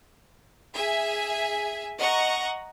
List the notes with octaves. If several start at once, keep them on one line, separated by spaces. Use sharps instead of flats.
G#4 E5 G#5
D#5 F#5 A#5 C#6